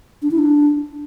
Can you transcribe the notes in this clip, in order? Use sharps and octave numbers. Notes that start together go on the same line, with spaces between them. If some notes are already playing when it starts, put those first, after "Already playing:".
D4
E4
D4